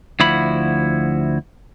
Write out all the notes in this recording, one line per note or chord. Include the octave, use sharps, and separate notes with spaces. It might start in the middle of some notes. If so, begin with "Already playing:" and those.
D2 F3 E4 F#4 B5